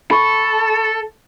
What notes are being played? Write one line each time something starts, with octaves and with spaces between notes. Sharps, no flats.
A4 B5 C#6